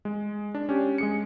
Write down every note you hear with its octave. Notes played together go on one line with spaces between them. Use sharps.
G#3
D4
C#4 G4
G#3 G#4 C#7